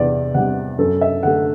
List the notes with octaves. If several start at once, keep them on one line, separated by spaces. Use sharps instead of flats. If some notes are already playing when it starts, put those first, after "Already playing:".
Already playing: E2 C3 D5
C3 G3 F#5
F#2 A4
E5
D3 A3 F#5